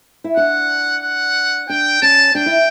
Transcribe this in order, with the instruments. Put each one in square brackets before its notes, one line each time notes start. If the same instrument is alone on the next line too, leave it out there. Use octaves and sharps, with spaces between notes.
[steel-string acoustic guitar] E4
[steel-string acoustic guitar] D4 [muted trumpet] F#5
[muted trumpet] F#5
[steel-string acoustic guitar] D4 [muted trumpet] G5
[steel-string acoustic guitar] C#4 [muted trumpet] A5
[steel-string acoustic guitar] D4 [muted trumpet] G5
[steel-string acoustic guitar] E4